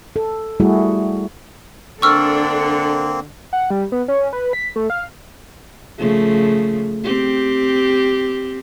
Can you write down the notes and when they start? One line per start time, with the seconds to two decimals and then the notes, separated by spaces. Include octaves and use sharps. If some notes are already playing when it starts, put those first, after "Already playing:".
0.16 A4
0.60 G3 A3 E4 F#4 G#4
2.02 D3 A#3 C4 D4 A4 C#6 E6 F6
3.53 F#5
3.71 G3
3.92 B3
4.08 C#4
4.33 B4
4.53 B6
4.76 A3
4.90 F5
5.98 C#3 F3 A3
7.04 C4 G4